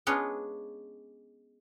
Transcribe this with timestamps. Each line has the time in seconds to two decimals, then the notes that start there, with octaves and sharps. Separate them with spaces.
0.07 G#3 B3 C#4 D4 F4